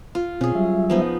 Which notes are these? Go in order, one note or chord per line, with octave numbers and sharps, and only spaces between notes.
F4
B2 C4 C#4 G#4
F#3 G3 E5
F3 B3 D#4